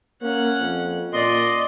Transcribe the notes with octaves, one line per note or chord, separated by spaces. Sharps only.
A#3 C#4 F#5
F2
A#2 D5 D#5 C6